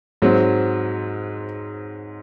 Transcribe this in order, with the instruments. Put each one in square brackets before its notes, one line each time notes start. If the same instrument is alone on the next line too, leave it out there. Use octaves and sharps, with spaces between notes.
[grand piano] G#2 F#3 C4